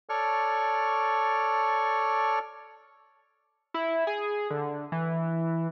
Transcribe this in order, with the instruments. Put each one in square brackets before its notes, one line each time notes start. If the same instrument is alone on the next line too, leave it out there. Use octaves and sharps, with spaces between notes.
[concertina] A4 C#5 D5 C#6 F6
[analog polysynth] E4
G#4
D3
E3